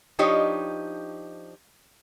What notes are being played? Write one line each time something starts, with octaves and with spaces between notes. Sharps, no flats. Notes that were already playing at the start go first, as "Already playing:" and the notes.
F3 D4 D#4 G4 C#5 D#5